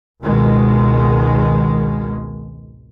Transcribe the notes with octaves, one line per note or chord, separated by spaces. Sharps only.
G#1 C#2 B2 D#3 G#3